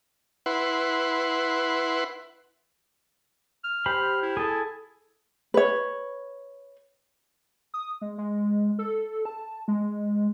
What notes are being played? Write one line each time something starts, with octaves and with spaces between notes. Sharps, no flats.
E4 B4 F#5 C6
F6
G4 C5 B5
E4
G#4 A4
B4 C#5
D#6
G#3
G#3
A4
A5
G#3